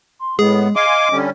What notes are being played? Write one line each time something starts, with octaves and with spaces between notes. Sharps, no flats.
C6
A2 G#3 B3 G#4
D#5 F5 G#5 C6 D6
D3 G3 C#4